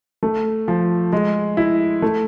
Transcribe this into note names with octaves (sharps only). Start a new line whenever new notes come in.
A3
F3
G#3
E4
A3